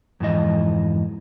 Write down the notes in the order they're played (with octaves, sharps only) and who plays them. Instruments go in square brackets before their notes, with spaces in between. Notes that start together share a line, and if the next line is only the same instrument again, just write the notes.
[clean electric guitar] F2 G#2 E3 D#5